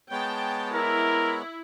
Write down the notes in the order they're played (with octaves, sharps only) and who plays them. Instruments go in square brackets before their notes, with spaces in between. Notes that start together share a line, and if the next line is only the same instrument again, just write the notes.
[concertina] G#3 B3 C#5 [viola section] G5 A5
[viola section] E4 [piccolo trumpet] A#4